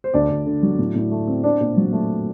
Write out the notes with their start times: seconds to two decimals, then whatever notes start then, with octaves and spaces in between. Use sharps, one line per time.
0.04 C5
0.14 D2 D4 D5
0.30 D2
0.46 D3
0.63 F#3
0.79 A2
0.95 A2
1.11 A3
1.27 C4
1.44 C4 D4 D5
1.61 A#2
1.77 F#3
1.93 A3